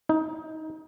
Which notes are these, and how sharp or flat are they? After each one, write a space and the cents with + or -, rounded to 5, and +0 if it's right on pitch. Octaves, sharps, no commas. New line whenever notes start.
D#4 +20